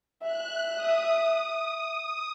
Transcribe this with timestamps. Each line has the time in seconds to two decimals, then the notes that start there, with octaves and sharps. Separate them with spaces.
0.22 E5 F#6
0.75 D#6